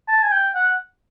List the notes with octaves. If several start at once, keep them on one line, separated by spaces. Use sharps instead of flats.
A5
G#5
G5
F#5